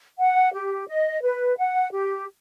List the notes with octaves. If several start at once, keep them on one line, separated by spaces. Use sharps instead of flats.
F#5
G4
D#5
B4
F#5
G4